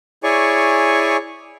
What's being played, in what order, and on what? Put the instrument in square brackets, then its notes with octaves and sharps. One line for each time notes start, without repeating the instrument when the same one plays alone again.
[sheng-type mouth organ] E4 G#4 C#5 D5 G#5 C#6